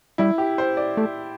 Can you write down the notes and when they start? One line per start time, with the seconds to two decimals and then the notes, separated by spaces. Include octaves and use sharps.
0.18 G3 E4
0.38 G4
0.58 C5
0.77 D5
0.97 A3